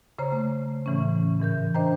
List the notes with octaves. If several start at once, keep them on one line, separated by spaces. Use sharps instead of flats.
C#3 C5 C#5 A#5
A3
A2 C#3 E3 A3 C#4
G#2 E3 A#4 G6
D4 C5 D#5 G5 A#5